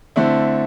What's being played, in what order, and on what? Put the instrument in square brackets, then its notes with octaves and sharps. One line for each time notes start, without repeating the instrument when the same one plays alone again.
[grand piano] D3 A3 C4 E4